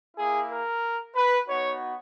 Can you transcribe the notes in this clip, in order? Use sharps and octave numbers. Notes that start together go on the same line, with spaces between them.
A#3 E4 G#4
A#4
B4
B3 D#4 F#4 C#5